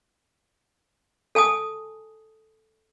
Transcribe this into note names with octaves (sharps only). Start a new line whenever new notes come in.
A4 G#5 A5 D#6